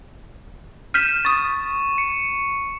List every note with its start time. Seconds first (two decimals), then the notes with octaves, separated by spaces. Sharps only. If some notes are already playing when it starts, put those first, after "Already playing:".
0.94 F6 G6 B6 D#7 E7
1.25 C#6 D#6 A6
1.98 C#7